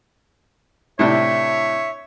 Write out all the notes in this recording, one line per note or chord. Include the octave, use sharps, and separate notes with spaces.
A2 C3 D4 C#5 E5